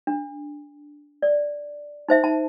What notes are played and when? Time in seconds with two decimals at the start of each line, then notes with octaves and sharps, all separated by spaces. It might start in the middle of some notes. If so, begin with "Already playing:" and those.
0.07 D4
1.22 D5
2.09 D#4 C5 E5
2.23 D#4 A5